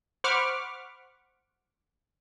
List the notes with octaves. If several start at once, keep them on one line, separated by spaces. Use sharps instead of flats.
C5 F#5 B5 C#6 D6 F6